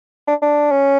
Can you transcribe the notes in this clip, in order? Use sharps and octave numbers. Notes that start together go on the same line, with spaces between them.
D4
D4
C#4